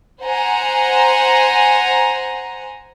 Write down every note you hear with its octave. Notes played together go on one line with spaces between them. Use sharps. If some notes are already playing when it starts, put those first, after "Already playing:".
C5 F#5 G#5 A#5